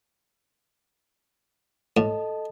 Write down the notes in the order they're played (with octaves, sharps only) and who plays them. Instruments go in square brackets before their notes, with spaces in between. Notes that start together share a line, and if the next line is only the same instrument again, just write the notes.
[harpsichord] A2 [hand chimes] A4 D#5 A5